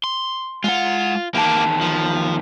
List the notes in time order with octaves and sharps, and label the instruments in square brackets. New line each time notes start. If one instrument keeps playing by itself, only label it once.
[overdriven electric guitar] C6
[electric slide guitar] G#3 F#5 [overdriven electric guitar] F4
[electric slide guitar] E2 D#3 A5 [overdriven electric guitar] A#3 G4
[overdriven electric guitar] F3